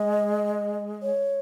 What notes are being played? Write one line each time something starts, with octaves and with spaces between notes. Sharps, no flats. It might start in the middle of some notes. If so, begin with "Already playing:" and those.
Already playing: G#3 D#5
C#5